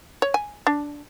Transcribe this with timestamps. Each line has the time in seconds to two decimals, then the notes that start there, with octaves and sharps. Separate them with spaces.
0.22 C#5
0.34 G#5
0.67 D4